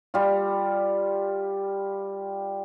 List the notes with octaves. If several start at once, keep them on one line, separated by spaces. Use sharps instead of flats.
G3 F4